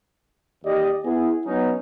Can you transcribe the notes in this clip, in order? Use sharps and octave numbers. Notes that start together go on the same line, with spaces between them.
D#2 G4 D5 D#5
B3 E4 G#4
F#3 B3 C#4 D#4